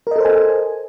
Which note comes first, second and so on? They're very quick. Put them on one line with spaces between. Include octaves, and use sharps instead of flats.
A#4 D#5 A4 C5 G#5